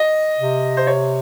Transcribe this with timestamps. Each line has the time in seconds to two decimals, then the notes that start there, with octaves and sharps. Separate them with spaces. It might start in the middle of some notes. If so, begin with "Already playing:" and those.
Already playing: D#5
0.39 C3
0.77 C5
0.87 C#5